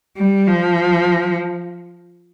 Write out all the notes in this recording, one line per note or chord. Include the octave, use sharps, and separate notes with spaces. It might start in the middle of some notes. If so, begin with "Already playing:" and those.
G3
F3